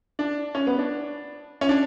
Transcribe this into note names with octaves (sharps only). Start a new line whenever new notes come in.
D4
C#4
B3
D4
C#4
D4